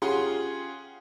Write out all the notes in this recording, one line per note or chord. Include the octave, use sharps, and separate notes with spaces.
C#4 F4 G4 G#4 F#5 C6